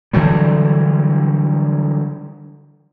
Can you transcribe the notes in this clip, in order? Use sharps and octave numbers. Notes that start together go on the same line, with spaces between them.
D3 E3 F#3 G3